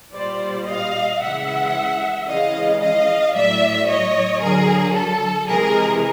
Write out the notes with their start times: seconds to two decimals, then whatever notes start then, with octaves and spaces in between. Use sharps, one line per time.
0.14 A#2 G3 C5 D5
0.68 D#5 F5
1.21 C#3 E3 G#3 E5 F#5
2.28 C#3 E3 G#3 D#5 F5
2.81 D#5 F5
3.35 A2 F#3 D5 E5
3.89 C#5 D#5
4.42 D3 F#3 G#4 A#4
4.96 A4
5.48 C3 E3 G#3 G#4 A#4